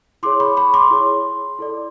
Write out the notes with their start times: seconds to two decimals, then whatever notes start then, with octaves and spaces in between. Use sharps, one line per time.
0.23 E4 G#4 C#5 C6 D6
0.40 B5 C#6
0.57 B5 C#6
0.74 C6 D6
0.91 E4 G#4 C#5
1.59 E4 A4 D5